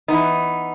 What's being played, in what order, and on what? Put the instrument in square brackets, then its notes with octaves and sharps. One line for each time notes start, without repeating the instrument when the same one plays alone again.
[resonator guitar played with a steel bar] E3 B3 D#4